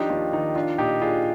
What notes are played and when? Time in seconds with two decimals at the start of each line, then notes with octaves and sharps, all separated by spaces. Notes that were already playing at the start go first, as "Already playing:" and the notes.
Already playing: F3 D4 D#4 G4
0.10 D#2 F4
0.33 D#3 D#4
0.56 D4 F4
0.78 A#2 D#4 G4
1.01 D4 F4 G#4